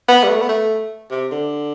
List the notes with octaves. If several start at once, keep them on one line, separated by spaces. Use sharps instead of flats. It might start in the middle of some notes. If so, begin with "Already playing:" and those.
B3
G3
A3
B3
A3
C3
D3